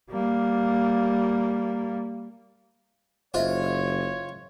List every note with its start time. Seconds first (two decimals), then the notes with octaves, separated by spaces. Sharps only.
0.11 G3 A#3
3.34 F#1 F4 C5 C#5 D#5 E5